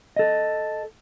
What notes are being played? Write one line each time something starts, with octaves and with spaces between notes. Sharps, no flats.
A4 D#5